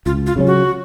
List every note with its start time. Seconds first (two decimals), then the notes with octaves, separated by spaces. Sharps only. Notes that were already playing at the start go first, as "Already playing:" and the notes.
0.06 C#2 F4
0.27 F4
0.36 C#3 F#3 C#4
0.47 F#4